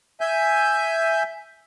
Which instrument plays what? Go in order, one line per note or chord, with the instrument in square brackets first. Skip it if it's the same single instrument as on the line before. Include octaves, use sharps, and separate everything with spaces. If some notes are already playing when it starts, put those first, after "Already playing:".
[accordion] E5 G#5 G6